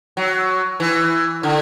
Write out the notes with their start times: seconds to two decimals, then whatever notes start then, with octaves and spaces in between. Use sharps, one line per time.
0.17 F#3
0.80 E3
1.43 D3